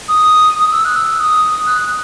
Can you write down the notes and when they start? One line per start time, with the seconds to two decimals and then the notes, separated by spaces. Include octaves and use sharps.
0.09 D#6
0.72 E6
0.85 F#6
0.96 E6
1.19 D#6
1.66 F#6